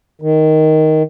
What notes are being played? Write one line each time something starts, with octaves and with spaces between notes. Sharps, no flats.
D#3